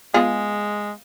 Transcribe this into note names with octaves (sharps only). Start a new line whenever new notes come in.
G#3 B3 F4 G#4